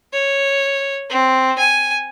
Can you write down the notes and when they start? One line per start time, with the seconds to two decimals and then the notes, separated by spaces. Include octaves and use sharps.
0.13 C#5
1.10 C4
1.59 G#5